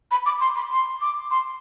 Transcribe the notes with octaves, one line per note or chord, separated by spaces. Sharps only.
B5
D6
C6
B5
C6
D6
C6